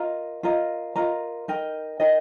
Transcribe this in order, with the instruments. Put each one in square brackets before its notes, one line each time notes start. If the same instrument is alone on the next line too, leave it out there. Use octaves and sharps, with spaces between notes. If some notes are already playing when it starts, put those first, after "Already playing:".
Already playing: [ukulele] F4 A#4 D#5 A#5
F4 A#4 D#5 A#5
F4 A#4 D#5 A#5
D#4 A#4 D#5 G5
D#4 A#4 D#5 G5